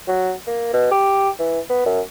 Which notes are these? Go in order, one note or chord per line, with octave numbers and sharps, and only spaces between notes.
F#3
A#3
B2
G4
E3
B3
F#2